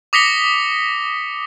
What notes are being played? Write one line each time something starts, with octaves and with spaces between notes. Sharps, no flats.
D6 D#6 A#6 B6 C#7 G7